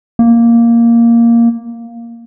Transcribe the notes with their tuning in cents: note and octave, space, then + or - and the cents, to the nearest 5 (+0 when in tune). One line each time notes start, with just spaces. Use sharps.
A#3 +0